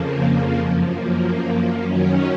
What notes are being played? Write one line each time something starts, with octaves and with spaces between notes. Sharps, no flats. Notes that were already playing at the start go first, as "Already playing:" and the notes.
Already playing: F2 C#3 F3 A#3
F#2 F3 G#3
A#3
F#2 D#3 F#3 C#4